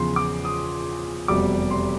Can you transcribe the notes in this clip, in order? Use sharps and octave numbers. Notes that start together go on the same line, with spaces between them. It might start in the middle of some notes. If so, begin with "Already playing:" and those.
Already playing: E2 C#3 F3 C6
D6
D#6
F1 E2 B2 G3 D6
C6